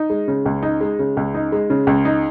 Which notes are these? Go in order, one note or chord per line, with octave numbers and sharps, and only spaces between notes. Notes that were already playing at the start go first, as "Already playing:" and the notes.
Already playing: D#4
G#3
C#3
C#2
D#4
G#3
C#3
C#2
D#4
G#3
C#3
C#2
D#4